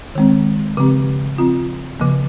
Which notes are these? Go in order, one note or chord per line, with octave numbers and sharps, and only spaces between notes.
D#3 G#3 C4
C#3 F3 C4 G4
F3 C4 F4
C#3 F3 A#3